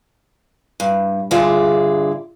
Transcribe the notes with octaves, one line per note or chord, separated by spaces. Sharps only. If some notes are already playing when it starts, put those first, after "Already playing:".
G2
G2 D3 F4 G#4 D5 E5